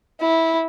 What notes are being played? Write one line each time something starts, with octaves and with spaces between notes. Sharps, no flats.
E4